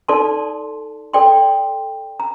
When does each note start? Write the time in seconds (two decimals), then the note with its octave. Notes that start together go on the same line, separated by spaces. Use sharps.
0.08 D#4 A4 D5 A5 C6
1.13 A4 D5 G5 C6
2.20 A#5